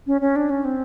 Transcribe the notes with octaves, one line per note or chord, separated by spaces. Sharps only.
C#4
C#4
D4
C#4
C4